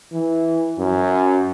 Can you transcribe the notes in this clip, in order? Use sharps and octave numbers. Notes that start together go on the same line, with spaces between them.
E3
F#2